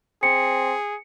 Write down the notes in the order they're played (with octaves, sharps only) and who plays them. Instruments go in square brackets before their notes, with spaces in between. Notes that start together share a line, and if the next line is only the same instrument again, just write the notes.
[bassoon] C4 [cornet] G#4 [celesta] C#7